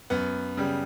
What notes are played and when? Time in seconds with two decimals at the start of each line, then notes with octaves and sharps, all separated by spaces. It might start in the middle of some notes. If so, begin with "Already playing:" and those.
0.10 F#2 B3
0.57 C#3 G3